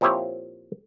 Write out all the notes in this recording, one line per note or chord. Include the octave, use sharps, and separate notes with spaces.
A#2 F3 C4 E4 G4 C#5